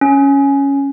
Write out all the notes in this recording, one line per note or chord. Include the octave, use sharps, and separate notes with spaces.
C#4